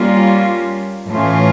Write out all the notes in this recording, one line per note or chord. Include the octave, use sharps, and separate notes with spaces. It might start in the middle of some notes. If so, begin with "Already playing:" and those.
Already playing: G3 A#3 C#4 F4
A2 E3 A3 C#4 F4